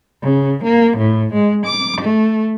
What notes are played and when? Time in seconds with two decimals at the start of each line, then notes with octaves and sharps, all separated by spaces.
0.22 C#3
0.64 A#3
0.98 A2
1.33 G#3
1.65 D6
2.01 A3